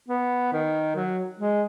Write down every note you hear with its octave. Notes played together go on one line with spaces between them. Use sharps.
B3
D#3
F#3
G#3